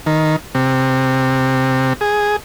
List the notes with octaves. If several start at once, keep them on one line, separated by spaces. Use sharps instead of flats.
D#3
C3
G#4